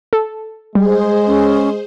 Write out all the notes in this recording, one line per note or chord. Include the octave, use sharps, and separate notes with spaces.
A4
G3 G#3 G#4 C5
C#4